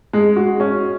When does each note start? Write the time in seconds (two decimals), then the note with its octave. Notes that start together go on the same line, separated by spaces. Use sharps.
0.13 G#3
0.36 F#4
0.60 C#4